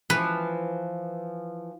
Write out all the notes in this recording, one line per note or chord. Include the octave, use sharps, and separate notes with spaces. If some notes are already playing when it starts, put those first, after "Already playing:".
E3 F3 B4